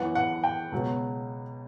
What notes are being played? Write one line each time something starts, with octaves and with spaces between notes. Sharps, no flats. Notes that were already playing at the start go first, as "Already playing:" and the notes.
Already playing: F#2 E3 B3 F#5
F#5
G5
C#2 B2 F#3 B3